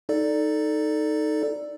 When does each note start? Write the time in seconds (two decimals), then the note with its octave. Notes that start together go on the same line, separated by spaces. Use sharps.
0.09 D#4 A4 D5